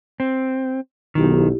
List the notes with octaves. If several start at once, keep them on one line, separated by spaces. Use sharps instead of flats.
C4
B1 D#3 E4 G4